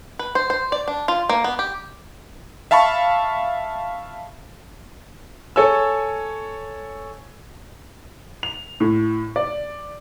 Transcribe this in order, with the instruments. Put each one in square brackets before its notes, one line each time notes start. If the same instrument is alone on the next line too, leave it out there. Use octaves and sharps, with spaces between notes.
[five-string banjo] B4
C5
C5
D5
D4
F4
A#3
B3
G4
[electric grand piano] E5 F5 A5 B5 C#6
[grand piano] A4 C#5 G#5 E6
[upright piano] F7
A2
D5